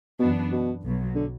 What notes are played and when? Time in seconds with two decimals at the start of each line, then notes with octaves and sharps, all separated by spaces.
0.19 F#2 B2 E3 B3 D4
0.52 B2
0.84 B1 B2 F#3
1.15 D3